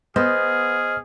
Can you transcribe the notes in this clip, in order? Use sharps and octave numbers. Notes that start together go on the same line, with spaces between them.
B3 G#4 C5 D#5 F6